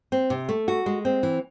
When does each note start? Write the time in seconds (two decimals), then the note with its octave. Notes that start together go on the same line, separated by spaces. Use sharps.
0.12 C4
0.30 C3
0.49 A3
0.68 F#4
0.86 G#3
1.05 C4
1.23 E3